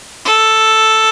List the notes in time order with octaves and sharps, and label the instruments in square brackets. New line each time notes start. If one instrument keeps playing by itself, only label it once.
[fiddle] A4